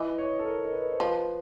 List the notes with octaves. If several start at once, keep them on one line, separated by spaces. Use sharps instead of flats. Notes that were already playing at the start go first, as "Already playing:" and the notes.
Already playing: E3 D#5
C#5
A4
A#4
A#4
B4
C5
F3 B4